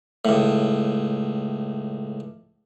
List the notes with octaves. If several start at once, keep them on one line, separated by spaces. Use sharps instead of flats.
C#2 A2